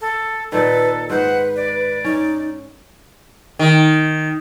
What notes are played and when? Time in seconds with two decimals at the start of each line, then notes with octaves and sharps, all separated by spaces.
0.01 A4
0.52 A#2 D#3 A4 B4
1.10 G#2 B4 C5 F#5
1.56 D5
2.04 C#4 D#4
3.59 D#3